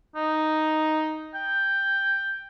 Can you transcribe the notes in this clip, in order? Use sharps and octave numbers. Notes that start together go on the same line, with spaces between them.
D#4
G5